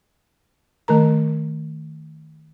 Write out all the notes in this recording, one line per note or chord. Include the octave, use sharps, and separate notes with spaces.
D#3 A3 A#4 A#5